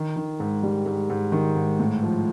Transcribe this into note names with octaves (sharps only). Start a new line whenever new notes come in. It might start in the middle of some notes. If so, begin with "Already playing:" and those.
Already playing: D#3
D#3
G#2
G3
G#2
G#2
D#3
G#2
A2
F3